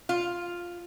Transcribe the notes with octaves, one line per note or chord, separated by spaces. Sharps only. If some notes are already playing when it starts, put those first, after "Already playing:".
F4